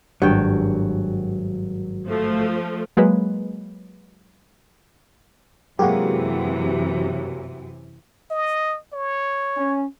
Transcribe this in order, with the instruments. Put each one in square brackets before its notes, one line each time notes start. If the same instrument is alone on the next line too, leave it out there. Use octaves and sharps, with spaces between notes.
[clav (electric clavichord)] G#1 [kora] G2 G5 [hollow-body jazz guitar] F#3
[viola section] F3 A3
[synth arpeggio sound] F#3 G#3 A#3 B4
[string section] F#2 C3 E3 [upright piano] F#3 G#3 A#3 [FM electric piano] F#4 G4
[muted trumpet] D#5
C#5
[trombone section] C#4